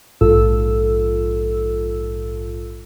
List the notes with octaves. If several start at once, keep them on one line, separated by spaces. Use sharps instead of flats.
A#1 G#2 F4 A4 E6